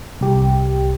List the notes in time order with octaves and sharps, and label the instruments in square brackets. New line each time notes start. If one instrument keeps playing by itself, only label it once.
[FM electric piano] C2 G4